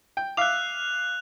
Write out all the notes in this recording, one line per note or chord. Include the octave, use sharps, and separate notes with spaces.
G5
E5 F5 D6 F#6 F7